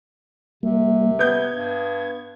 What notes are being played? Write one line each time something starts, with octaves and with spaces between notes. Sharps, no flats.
C3 G3 A#3
B3 G6 G#6
G2